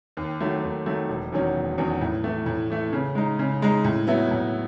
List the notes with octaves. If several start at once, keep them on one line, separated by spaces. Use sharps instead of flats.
D#2
D#3 F#3 A3
D#2
D#3 F#3 A3
E1
E2 D#3 F#3 C#4
E1
E2 D#3 F#3 C#4
A2
E3 A3
A2
E3 A3
C#3
G#3 D#4
C#3
G#3 D#4
A2
F#3 B3 E4
A2